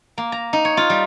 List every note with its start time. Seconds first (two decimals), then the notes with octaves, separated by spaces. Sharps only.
0.18 A#3
0.32 A#5
0.53 D#4
0.65 C#5
0.77 F4
0.90 G3